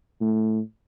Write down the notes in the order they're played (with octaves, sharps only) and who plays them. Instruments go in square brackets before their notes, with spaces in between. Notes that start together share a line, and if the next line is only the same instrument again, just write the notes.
[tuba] A2